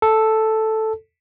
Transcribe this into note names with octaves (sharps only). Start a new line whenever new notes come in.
A4